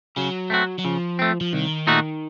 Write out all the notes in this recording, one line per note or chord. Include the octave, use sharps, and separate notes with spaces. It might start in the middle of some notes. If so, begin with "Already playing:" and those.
C#3 F#3
A3 C4 F#4
F#3
C#3 F3
A3 C4
F3
C2 D#3
A#2 A3 D#4 F#4